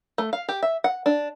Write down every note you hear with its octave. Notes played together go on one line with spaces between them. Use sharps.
A3
F5
G4
E5
F#5
D4